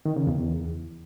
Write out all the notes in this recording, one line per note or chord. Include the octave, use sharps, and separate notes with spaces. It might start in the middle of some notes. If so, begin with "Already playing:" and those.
D#3
C#3
E2
E2